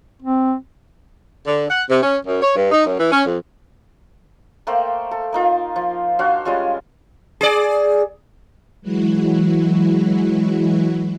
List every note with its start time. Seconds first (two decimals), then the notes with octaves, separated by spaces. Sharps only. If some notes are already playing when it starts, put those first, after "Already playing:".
0.22 C4
1.46 D3
1.69 F#5
1.89 C3
2.03 C#4
2.25 F#2
2.42 C#5
2.56 G2
2.71 D#4
2.86 F#2
2.99 E3
3.11 C#4
3.26 F2
4.67 A3 A#3 C5 G5
5.11 A4
5.33 A#3 D#4 F4
5.76 F3
6.19 D4 F#4 C5 F5
6.45 G3 G#3 C#4 F4
7.41 G#4 D5
8.82 E3 F#3 G#3 E4 F#4